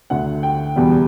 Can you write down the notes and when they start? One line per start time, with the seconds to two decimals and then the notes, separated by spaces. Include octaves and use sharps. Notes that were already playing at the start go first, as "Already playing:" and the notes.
0.10 D2 D3 A3 F#5
0.43 G5
0.76 E2 B2 G3 B3